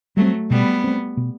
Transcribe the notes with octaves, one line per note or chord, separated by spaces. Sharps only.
F#3 G3 A3 C4
B2 G3 B3
A3 C4
B2